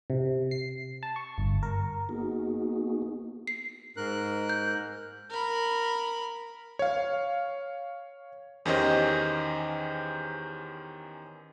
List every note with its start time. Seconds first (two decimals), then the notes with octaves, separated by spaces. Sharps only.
0.10 C3
0.51 C7
1.03 A5
1.16 C#6
1.38 G1
1.63 A#4
2.09 A#3 B3 D#4 F#4 G#4
3.47 C7
3.97 G#2 A#4 F#6
4.49 G6
5.30 A#4 B5
6.79 C#5 F5
8.65 E2 D#3 C#4 G4 C5 D#5